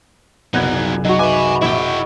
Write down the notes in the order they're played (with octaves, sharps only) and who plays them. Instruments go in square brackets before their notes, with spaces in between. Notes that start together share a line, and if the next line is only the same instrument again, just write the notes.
[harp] F#1 C2 F#2 [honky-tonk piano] B3 F#6 G#6 [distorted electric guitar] D#4 F#4
[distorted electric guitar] F#3 [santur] D#4 F#4
[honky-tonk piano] B4 E5 D6 [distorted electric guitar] G#5 B5
[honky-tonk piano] A#1 [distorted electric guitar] E4 G5 [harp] D#5 B5
[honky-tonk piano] F#5